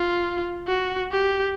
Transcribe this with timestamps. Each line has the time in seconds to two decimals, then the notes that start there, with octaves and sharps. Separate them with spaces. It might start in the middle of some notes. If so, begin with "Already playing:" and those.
Already playing: F4
0.67 F#4
1.12 G4